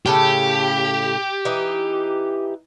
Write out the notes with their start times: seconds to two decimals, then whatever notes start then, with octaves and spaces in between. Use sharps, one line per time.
0.06 A2 C#3 G4 A4
1.45 E3 D#4